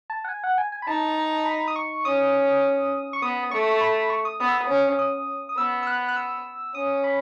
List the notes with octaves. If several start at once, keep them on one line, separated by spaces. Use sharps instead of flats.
A5
F#5
G#5
F#5
G#5
G#5
B5
D#4 A5
B5
D#6
C#6
C#4 D#6
C#6
B3 D#6
A3 C#6
B5
B5
C#6
D#6
B3 D#6
E6
D#6
C#4
D#6
D#6
B3 E6
E6
F#6
F#6
E6
C#4 D#6
B5